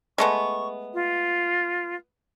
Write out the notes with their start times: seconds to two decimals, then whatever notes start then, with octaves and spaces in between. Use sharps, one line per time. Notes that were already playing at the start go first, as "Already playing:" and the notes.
0.18 G#3 A3 B3 C#6
0.94 F4